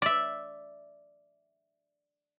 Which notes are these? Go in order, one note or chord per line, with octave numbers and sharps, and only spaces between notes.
D5 E5